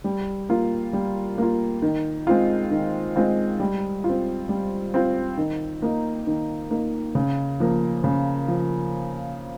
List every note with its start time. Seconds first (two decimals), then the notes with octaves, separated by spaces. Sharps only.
0.04 G3
0.49 A#3 F4
0.93 G3
1.38 A#3 F4
1.82 D#3
2.27 G#3 C4 F4
2.71 D#3
3.16 G#3 C4 F4
3.60 G3
4.04 F4
4.09 C4
4.49 G3
4.94 C4 F4
5.38 D#3
5.82 A#3 D#4
6.27 D#3
6.71 A#3 D#4
7.15 C#3
7.60 F3 A#3
8.04 C#3
8.48 F3